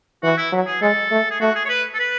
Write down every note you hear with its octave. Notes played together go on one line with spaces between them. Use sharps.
E3 F#4
E4
F#3
G#4
G#3 A4
A3
G#4
A3 F#4
G#4
C#5
B4
A4
B4